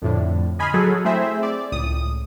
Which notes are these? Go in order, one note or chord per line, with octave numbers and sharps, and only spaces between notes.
F2 A2 D3
D#5 G#5 B5 C6 D#6 F6
F#3 G#4 A4
A3 C4 E4 G#4 C5 E5
D5
C#2 A2 D#6